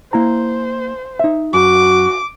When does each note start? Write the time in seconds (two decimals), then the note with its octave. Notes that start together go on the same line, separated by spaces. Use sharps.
0.13 A#3 E4 C5 A#5
1.19 D#4 E5
1.53 F#2 F#4 D6